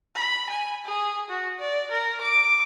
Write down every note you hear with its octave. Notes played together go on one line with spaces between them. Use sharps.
B5
G#5
G#4
F#4
D5
A#4
D6